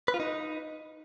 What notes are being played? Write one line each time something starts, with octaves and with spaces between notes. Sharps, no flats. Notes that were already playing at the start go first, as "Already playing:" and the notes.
B4
F4
D#4